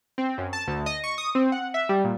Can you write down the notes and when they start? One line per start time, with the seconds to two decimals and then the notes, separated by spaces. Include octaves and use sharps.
0.18 C4
0.38 F#2
0.53 A5
0.68 D2
0.86 D#5
1.04 C#6
1.18 D#6
1.35 C4
1.52 F#5
1.74 E5
1.89 G3
2.04 A#2